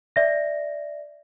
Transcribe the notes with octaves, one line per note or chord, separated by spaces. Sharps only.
D5 E5 A#6